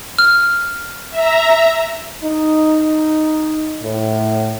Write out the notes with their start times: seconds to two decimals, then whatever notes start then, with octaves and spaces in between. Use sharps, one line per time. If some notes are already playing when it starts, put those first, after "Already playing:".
0.19 F6
1.10 E5 A#5
2.23 D#4
3.81 A2